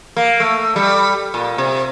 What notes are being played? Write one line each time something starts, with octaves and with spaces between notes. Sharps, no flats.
A#3
A3
G3
A#2
C3